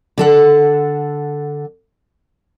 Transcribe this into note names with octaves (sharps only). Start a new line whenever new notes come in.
D3 A4 F#5